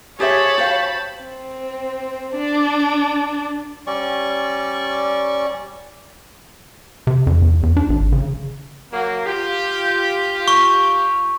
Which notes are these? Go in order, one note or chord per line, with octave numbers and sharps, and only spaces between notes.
G4 G#4 C5 C#5 E5 A5 B5
F#4 C5 F5 G5
C4
D4
G3 C#4 D5 C#6
C3
F2
E2
E2
D4
G#1
C#3
F#3 A#3
F4 G4
C#6